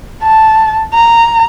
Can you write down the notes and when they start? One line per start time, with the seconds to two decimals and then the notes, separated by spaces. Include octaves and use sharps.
0.23 A5
0.93 A#5